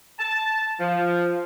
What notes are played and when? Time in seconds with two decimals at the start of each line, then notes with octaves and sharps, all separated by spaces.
0.19 A5
0.80 F3